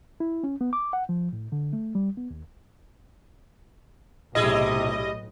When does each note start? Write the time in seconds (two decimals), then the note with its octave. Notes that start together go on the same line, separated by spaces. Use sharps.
0.20 E4
0.43 C#4
0.61 B3
0.73 D6
0.93 F#5
1.09 F3
1.33 A2
1.52 D3
1.73 A3
1.95 G3
2.17 B3
2.31 D#2
4.35 B1 A2 C3 G3 E4 G#4 D#5